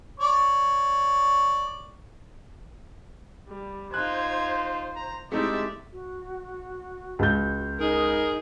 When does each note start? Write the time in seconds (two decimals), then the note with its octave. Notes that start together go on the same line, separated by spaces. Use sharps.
0.20 C#5 D5
3.49 G3
3.94 D#4 F4 C5 F#6 G#6
4.95 A#5
5.32 G#3 A3 C4 D#4 E4 G4 D5 E5
5.92 F#4
7.19 C#2 G6
7.79 D#4 G#4 A#4